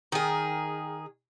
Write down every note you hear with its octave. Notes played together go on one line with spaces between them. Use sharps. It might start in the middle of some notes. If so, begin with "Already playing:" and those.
D#3 G#4